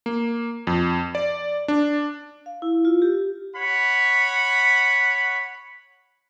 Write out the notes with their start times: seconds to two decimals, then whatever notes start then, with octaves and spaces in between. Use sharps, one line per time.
0.06 A#3
0.67 F2
1.15 D5
1.68 D4
2.46 F5
2.62 E4
2.85 F4
3.02 G4
3.56 C#5 F#5 B5